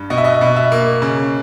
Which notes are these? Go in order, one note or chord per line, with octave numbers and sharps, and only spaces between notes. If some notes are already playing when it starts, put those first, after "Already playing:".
Already playing: G2
B2 D#5
E5
D#5
B2
E5
A#3
C#3